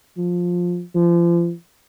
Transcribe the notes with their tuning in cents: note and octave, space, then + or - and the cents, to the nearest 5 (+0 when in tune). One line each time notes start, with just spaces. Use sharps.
F3 +15
F3 -35